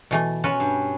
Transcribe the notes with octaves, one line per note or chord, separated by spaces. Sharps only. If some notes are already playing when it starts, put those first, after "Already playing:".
B2 E3 A3
C#4 F4 F#4 B4
G2